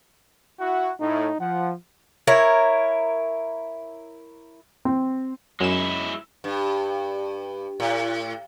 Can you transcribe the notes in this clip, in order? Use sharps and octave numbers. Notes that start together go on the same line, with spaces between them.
E4 F#4 F#5
A2 D#4
F3 F#5
E4 A#4 C#5
C4
F#2 G#3 E4 E7
G2
A2